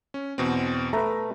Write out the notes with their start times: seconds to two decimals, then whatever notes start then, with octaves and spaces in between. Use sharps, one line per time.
0.14 C#4
0.38 E2 B2 C4
0.93 A3 B4 A#5